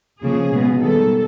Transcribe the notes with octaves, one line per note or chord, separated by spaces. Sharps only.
C#3 F3 A#3 G#4
B2 G#3 B3
D#3 G3 B3 A4